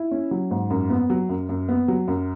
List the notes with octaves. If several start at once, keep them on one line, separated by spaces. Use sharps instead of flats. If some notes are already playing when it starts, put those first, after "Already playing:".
Already playing: E4
C#4
F#3
G#2
F#2
B3
F#3
F#2
F#2
B3
F#3
F#2